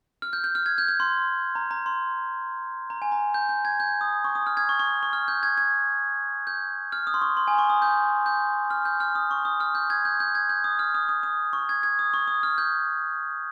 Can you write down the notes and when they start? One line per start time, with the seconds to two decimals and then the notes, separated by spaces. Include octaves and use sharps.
0.22 F6
0.33 G6
0.44 G6
0.55 F6
0.66 G#6
0.78 G6
0.88 G6
1.00 C6
1.55 A#5
1.71 A#5
1.86 C6
2.90 A#5
3.02 G#5
3.12 A#5
3.34 G6
3.49 G6
3.65 G#6
3.80 G6
4.01 D#6
4.24 C#6
4.35 D#6
4.47 F6
4.57 G#6
4.69 C#6
4.79 C#6
5.03 C#6
5.13 F6
5.28 G6
5.43 G#6
5.57 G#6
6.47 G6
6.92 F6
7.07 D#6
7.14 C6
7.22 C#6
7.37 C6
7.48 G#5
7.58 C#6
7.70 D#6
7.82 G6
8.26 G6
8.71 F6
8.85 G6
9.00 F6
9.15 D#6
9.31 C#6
9.45 D#6
9.60 F6
9.75 G6
9.90 G#6
10.05 G6
10.20 G6
10.35 G#6
10.49 G6
10.64 D#6
10.79 F6
10.95 D#6
11.09 D#6
11.23 D#6
11.53 C#6
11.69 G#6
11.83 G#6
11.99 D#6
12.14 C#6
12.28 D#6
12.43 F6
12.58 G6